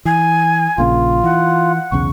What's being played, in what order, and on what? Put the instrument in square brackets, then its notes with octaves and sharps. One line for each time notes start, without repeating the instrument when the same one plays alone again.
[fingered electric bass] E3 [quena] G#5
[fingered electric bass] A#1 A#2 C#3 [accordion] F4
[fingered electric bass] E3 [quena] F#5
[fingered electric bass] B1 E2 C#3 [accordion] C#6